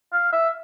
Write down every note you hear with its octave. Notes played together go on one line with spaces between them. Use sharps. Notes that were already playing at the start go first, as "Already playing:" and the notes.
F5
E5